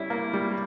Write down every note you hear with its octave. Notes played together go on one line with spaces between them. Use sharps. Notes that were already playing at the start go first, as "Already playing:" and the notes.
Already playing: G3 C#4 E4
A#3
G3